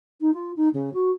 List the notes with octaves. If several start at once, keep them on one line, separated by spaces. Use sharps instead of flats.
D#4
F4
D#4
C#3
F#4